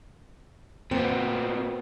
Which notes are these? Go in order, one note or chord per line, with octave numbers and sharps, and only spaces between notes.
A#2 B3 C4